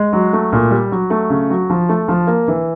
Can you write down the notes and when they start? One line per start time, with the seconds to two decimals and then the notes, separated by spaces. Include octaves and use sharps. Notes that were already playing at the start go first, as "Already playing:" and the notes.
Already playing: G#3
0.13 F#3
0.33 A3
0.53 A#2
0.71 G3
0.92 F#3
1.10 A3
1.30 C#3
1.50 F#3
1.70 F3
1.89 A3
2.08 F3
2.27 A#3
2.48 E3